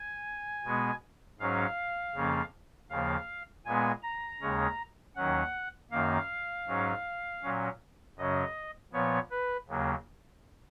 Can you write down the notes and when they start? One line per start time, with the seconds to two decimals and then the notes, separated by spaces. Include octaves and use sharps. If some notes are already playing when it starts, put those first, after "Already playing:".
Already playing: G#5
0.64 B2 G#3 B3
1.39 G#2 F#3 C#4 F5
2.15 F2 C#3 F3 A#3 C#4
2.90 D#2 C#3 F3 A#3 F5
3.65 A#2 G#3 B3 G#5
4.03 A#5
4.41 D#2 C#3 G#3 C#4
5.16 D#2 D#3 F#3 C#4 F#5
5.91 F#2 D#3 A#3 F5
6.67 G#2 F#3 C#4
7.43 A#2 F#3 C#4
8.17 F#2 C#3 F#3 C#4 D#5
8.93 A#2 F3 B3 C#5
9.31 B4
9.68 D#2 C#3 F#3 A#3